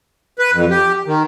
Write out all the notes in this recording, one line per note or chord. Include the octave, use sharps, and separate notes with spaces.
B4
F2
G4
D#3